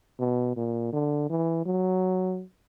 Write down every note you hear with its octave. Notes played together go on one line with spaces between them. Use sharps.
B2
A#2
D3
E3
F#3